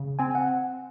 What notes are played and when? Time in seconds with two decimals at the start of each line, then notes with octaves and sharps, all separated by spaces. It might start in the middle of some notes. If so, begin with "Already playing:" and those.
Already playing: C#3
0.19 C4 G#5
0.35 F#5